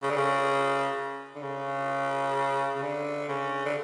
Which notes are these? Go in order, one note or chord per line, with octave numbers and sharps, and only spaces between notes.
C#3
D3
C#3
D3
C#3
C#3
D3
C#3
D3